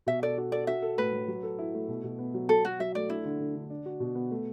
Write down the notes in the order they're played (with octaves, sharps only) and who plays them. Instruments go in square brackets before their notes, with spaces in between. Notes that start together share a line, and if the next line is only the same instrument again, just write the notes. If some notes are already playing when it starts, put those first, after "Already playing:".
[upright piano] B2 [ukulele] E5
[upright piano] A4 [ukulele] D5
[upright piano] F#4
[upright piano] A4 [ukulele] D5
[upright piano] F#4 [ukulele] E5
[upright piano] A4
[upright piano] A2 [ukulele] B4
[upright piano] A2
F#3
A4
E4
A3
B2
B2
B3
F#3
[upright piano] F#3 [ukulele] A4
[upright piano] F#3 [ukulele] F#4
[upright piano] F#3 [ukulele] E5
[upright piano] A3 [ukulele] D5
[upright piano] D4 [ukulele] E4
[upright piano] D3
D3
D3
D4
F#4
B2
B3
A3